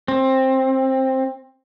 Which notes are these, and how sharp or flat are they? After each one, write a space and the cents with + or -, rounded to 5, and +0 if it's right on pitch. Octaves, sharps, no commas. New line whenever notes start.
C4 +15